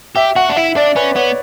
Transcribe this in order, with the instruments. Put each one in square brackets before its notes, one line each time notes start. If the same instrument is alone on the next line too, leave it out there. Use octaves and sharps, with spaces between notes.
[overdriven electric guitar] G4 [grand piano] E5
[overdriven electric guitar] F#4 [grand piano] F#5
[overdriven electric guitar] D4
[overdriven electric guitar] E4 [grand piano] E5
[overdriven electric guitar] D4 [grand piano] D5
[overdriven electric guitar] C#4 [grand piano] B4
[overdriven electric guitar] B3 [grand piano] C#5